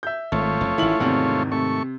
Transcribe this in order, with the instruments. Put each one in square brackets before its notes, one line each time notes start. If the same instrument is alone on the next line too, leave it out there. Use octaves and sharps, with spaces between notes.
[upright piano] E5 G6
[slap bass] G#1 [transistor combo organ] A3 F4 C#5
[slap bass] F1
[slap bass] A1 D#3 [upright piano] E4 F#7
[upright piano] E2 C3 [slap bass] G#2 D#3
[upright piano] C3 [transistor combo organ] A3 C#6